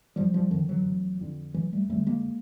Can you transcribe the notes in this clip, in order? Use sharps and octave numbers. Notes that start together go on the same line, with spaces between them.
F1 F3 G3
F3 G3
F2 D3 D#3 F3
E3 F#3
F1
F2 D3
F1 E3 F#3
G3 A3
F2 D3 G3 A3
G#3 A#3